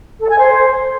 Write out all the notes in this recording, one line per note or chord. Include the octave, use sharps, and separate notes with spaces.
A4
G#5
C5